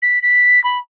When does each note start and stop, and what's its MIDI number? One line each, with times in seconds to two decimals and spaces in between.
0.02 0.19 95
0.22 0.62 95
0.64 0.78 83